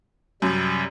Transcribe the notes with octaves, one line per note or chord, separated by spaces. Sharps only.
F#2 C3 G3